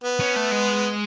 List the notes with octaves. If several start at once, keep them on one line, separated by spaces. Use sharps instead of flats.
B3
C#4
A3
G#3